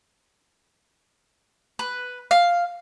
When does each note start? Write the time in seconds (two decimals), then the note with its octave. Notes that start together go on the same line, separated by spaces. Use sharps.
1.79 B4
2.31 F5